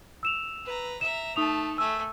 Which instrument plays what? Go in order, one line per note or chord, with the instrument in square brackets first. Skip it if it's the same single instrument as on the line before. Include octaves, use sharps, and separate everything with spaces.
[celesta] E6 E7 F7
[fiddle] B4 A#5
[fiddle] E5 A#5 [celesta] E7
[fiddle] A3 A5 [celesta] D#4 D#6 F7
[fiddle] A3 G#5 [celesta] E6